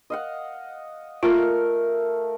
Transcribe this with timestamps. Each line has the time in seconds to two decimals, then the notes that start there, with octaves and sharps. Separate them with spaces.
0.10 D#5 F5 F#5
1.23 A3 F4 A#4 F5